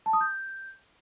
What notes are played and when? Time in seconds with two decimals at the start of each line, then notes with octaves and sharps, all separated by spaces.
0.06 A5
0.13 D#6
0.21 G6